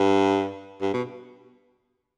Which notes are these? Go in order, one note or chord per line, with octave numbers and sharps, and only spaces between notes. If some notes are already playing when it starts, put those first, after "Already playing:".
Already playing: G2
G2
B2